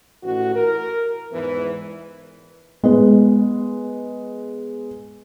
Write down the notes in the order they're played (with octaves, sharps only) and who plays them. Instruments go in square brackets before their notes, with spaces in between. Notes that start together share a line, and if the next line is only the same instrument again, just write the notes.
[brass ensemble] A1 F#4
A#4
E2 G#2 E3
[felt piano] G#3 B3